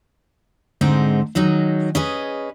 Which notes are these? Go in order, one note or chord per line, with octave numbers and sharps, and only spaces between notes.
G#2 D3 G#3 C4 D#4 G#4
D#3 F#3 G#3 D#4
C#4 G#4 B4 D#5